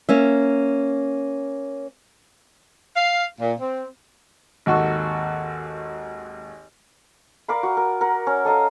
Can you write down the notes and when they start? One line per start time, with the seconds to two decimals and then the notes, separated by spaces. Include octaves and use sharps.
0.09 A#3 C#4 E5
2.96 F5
3.40 A#2
3.59 C4
4.66 G#1 D#2 F#4 A4 C#6
7.48 A#4 D5 F5 B5
7.63 F#4
7.77 A#4
8.01 A#4 F#5
8.27 C#4
8.45 A4 D#5 F5 A#5